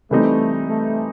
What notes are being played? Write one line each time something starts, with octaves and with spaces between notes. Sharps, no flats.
C3 E3 G3 A3 C4 D#4
A3